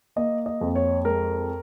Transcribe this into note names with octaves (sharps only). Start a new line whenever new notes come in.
A#3 D#5
D#5
F2
C#5
G#3 A#4